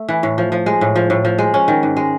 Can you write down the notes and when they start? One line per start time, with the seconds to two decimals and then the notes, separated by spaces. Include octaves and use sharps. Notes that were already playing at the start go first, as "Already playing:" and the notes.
Already playing: A3
0.09 E3
0.23 A2
0.38 F3
0.52 F3
0.66 G#3
0.81 A2
0.96 F3
1.10 A2
1.25 F3
1.38 G#3
1.54 C#4
1.68 D#3
1.83 G#2
1.97 G#3